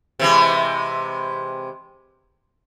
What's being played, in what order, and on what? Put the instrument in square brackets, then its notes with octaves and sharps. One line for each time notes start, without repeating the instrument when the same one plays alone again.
[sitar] C3 E3 G#3